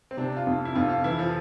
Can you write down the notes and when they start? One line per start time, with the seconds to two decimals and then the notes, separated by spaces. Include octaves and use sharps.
0.11 C4
0.17 C3 D4
0.36 F4
0.47 F2
0.65 E4
0.75 F2 F4
0.89 F4
1.04 E3 E4
1.19 F3